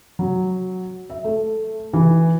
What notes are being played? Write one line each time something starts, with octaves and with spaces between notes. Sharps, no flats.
F#3
E5
A3
E3